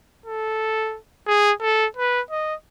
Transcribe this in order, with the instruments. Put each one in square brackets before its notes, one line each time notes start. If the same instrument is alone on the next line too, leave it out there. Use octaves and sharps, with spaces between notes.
[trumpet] A4
G#4
A4
B4
D#5